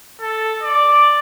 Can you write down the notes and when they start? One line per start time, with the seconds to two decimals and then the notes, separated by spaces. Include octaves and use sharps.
0.21 A4
0.63 D5